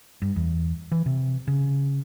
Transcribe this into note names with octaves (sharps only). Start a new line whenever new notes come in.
G2
E2
E3
C3
C#3